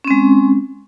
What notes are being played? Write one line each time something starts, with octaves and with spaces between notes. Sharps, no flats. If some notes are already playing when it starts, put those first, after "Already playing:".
G#3 C4 C#4